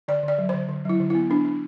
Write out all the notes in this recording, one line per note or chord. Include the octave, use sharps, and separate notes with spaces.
D3 D5
D3
D5
F#3
D3 C5
D3
F#3 E4
D3
B3 E4
B3 D4
D4